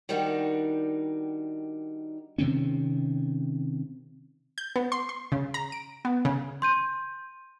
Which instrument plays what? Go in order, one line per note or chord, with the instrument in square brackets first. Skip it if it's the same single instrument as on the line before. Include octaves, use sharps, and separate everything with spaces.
[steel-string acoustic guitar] D#3 G3 D4 D#4 F#4 A#4
[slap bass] C3 D#3 C4 C#4
[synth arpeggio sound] G6
B3
C6
C6
C#3
A#5
D7
B3
C#3
[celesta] C6 G6 D#7